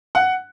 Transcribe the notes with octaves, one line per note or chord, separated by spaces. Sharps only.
F#5